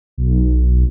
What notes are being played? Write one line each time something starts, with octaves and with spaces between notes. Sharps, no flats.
B1